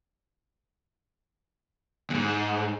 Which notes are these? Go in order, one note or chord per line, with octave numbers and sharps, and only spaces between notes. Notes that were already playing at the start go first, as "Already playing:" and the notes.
D#2 G#2